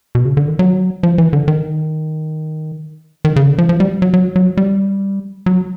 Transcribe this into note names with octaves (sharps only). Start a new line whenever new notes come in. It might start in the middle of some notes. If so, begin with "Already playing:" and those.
B2
C#3
D3
D#3
F#3
F3
E3
D3
D#3
D#3
C#3
D3
F3
F3
G3
F#3
F#3
F#3
G3
F#3